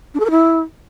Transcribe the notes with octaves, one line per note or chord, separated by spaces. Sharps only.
D4
A4
A#4
E4